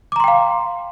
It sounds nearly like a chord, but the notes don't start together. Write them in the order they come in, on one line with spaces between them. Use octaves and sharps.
D6 A#5 C6 G5 F5